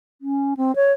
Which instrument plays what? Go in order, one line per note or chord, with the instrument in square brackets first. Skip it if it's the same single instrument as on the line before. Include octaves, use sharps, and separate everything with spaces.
[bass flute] C#4
C4
C#5